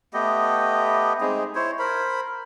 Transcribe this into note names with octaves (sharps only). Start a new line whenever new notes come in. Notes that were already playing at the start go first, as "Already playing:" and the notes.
A3 B3 G4 D#5
G#3 C4 D#4 G#4
E4 C5 C#5
A#4 C5 B5